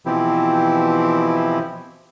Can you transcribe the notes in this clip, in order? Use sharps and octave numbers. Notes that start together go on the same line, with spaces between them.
B2 E3 F3 C4 E4 G4